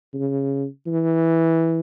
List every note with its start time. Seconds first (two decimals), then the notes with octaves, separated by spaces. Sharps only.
0.14 C#3
0.87 E3